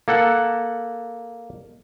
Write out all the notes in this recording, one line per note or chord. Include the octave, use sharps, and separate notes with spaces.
A#3 A4 F#5